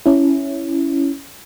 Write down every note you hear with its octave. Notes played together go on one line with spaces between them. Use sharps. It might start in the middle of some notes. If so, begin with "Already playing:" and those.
C#4 E4